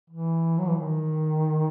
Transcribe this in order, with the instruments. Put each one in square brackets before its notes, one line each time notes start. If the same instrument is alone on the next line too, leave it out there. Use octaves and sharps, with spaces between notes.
[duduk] E3
F#3
E3
D#3